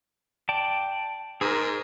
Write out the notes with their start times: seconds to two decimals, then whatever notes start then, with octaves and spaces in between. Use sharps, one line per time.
0.49 D5 G5 A5
1.41 G#2 G#4 A#4